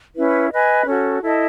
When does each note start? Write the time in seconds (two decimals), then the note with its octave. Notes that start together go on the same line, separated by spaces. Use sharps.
0.16 C#4 E4 B4
0.52 B4 D#5 G#5
0.86 C#4 F#4 A4
1.22 E4 A4 D#5 A5